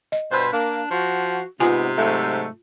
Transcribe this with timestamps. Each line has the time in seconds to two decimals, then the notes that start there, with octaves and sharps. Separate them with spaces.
0.12 D#5
0.32 G2 B2 B4 C5
0.52 A#3 D4
0.91 F3 F#4
1.60 G#2 C3 B3 F4 G#5
1.97 G#2 F#3 A3